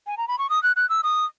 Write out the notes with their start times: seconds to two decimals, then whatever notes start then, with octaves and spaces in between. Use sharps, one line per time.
0.07 G#5
0.17 A#5
0.28 B5
0.39 C#6
0.50 D#6
0.63 F#6
0.76 F#6
0.89 E6
1.03 D#6